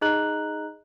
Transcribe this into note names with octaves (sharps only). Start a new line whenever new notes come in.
D#4 G#4 D#5 A#5 F#6 F#7